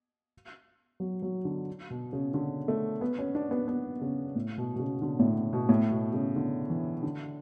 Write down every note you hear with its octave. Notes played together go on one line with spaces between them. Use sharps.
F#3
F#3
D3
B2
C#3
D3
A3
B3
C#4
D4
B3
B3
C#3
A2
B2
B2
C#3
D3
A2
B2
A2
B2
C#3
D3
E3
D3